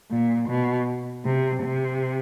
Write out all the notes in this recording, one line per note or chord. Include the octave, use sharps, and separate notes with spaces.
A#2
B2
C3
C3